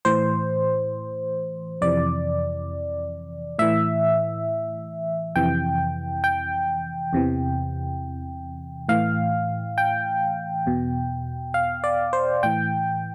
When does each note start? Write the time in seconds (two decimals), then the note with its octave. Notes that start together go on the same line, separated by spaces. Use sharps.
0.05 A2 E3 C5
1.82 F2 C3 E3 D5
3.58 A2 E3 E5
5.36 F2 C3 E3 G5
6.24 G5
7.13 E2 C3 E3
8.89 A2 E3 F5
9.78 G5
10.66 E2 B2
11.54 F5
11.84 D5
12.13 C5
12.43 A2 E3 G5